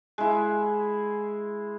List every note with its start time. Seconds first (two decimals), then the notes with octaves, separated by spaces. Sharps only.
0.18 G#3 E4